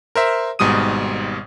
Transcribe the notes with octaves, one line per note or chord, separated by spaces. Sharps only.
A#4 C5 E5
G#1 G#2 B2 G3 D#6 D#7